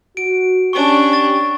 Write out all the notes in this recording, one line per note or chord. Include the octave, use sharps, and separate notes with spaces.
F#4 D7
C#4 D4 G4 C#6 D7
C#6 A6